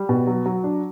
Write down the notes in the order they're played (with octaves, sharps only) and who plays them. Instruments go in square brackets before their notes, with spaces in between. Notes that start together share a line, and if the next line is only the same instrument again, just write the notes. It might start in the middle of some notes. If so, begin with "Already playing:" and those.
Already playing: [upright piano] G3
B2
F#3
F#3
D4